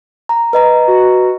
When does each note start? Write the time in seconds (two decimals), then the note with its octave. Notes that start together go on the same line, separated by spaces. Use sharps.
0.29 A#5
0.53 B4 D#5 A#5
0.87 F#4